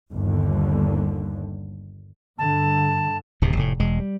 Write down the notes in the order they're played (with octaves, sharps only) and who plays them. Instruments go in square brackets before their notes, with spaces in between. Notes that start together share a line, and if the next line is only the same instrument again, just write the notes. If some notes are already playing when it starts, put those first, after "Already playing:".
[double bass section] G1 D#2 D3
[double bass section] G2 D3 [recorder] A5
[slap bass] D1 D#2 C3
F1 A2
E1 G#3
G3